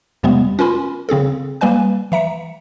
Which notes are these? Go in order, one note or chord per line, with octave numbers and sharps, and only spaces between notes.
F2 C3 G3 G#3 B3
C#4 F4 A#4 G#5 B5 C6
C#3 C4 G#4 A4
G3 A#3 B4 D5 G#5 F#6
E3 E5 A#5 C#7